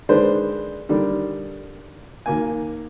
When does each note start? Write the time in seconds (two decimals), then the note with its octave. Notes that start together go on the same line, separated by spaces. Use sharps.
0.09 D3 D#3 G#3 D4 B4 C5
0.89 D3 D#3 G3
2.26 D#2 A#3 G#5